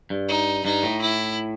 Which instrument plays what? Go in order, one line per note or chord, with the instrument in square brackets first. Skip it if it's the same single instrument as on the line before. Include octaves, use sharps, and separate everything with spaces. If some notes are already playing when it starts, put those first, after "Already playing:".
[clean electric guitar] G2
[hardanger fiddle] D#4
[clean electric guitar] G2 [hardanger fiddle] D#4
[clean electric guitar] A2
[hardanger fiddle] E4